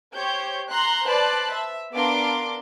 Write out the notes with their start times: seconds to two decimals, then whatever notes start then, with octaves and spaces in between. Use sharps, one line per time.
0.14 G4 C5 C#5 G6
0.67 A#5 C6 F#6
1.05 B4 C5 D5 A5 F#6
1.51 E5
1.93 B3 D4 A#4 F5 C6 D6